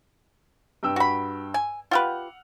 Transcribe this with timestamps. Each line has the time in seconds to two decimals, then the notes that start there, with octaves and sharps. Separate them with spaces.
0.83 G2 G5 E6
0.96 F#4 B5
1.54 G#5
1.91 F4 G4 B4 F#5 F6